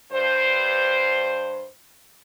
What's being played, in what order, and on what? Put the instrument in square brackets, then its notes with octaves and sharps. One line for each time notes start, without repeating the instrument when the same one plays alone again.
[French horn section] G2 C5